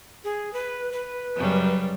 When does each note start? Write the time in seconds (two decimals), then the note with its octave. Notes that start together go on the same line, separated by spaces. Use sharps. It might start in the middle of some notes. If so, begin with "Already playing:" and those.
0.24 G#4
0.53 B4
0.92 B4
1.36 F#2 C#3 G3